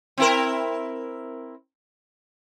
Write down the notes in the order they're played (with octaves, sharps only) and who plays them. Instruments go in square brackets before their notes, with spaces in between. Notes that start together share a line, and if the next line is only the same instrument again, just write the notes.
[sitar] C4 E4 A#4